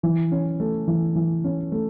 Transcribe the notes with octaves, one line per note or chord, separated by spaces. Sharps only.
E3
C#4
A3
E3
E3
C#4
A3